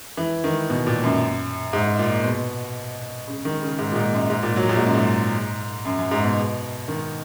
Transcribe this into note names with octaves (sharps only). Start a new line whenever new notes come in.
E3
D#3
B2
A#2
F#2
G#2
A#2
B2
C#3
D#3
C#3
G#2
A#2
G#2
F#2
G#2
A#2
F#3
A#2
G#2
F#2
G#2
F#2
F#2
G#2
B2
D#3